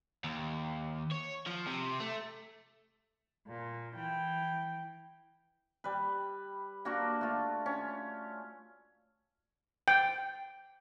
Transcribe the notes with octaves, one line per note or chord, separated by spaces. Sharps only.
D#2
C#5
F3
C3
A3
A#2
E3 G5
G3 B4
A#3 D4 F#4 A#4
A3 F4
C#4
G5